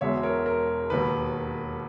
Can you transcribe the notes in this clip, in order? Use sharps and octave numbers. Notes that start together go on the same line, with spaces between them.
E1 E2 B2 G#3 C#5 E5
A#4 C#5
A#4
E1 D#2 D#3 B4